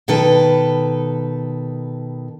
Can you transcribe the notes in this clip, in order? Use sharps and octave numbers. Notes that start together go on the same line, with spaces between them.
B2 D#3 A4 B4